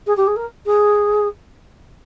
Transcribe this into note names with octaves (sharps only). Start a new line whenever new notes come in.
G#4
G4
G#4
A#4
G#4